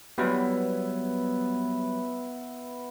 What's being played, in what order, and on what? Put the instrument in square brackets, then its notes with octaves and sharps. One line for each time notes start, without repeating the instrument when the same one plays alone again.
[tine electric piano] F#3 G3 [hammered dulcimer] B3 E4